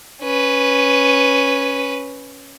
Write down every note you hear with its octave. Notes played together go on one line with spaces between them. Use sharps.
C#4 B4